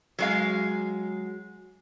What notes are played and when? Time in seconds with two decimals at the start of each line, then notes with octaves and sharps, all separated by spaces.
0.19 F#3 G#3 F5